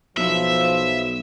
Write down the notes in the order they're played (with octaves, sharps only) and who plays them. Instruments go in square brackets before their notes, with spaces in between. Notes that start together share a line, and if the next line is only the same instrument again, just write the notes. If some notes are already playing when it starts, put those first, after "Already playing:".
[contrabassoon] B1 [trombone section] F3 [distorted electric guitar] E5